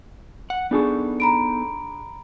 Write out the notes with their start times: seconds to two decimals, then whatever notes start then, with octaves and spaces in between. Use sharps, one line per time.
0.50 F#5
0.71 B3 D4 D#4 G#4 A4 C#6
1.20 A#5 B5 D7